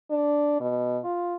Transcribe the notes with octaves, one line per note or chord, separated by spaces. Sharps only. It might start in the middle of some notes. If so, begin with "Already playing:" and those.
D4
B2
F4